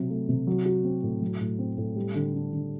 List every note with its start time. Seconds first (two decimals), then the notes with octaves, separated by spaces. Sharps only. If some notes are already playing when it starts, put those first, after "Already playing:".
Already playing: C3 F#3
0.10 A3
0.29 C3
0.47 F#3
0.66 F#4
0.85 C4
1.03 A2
1.22 F#3
1.41 A2
1.59 C4
1.78 A2
1.96 G3
2.15 D3
2.34 D4
2.53 D3